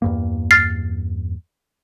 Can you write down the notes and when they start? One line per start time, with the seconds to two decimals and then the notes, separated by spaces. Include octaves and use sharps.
0.02 E2 G2 A#3
0.51 F6 A6 C7